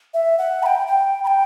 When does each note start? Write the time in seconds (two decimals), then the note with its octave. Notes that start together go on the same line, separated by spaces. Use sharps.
0.14 E5
0.38 F#5
0.63 B5
0.66 G5
0.87 G5
1.24 B5
1.27 G5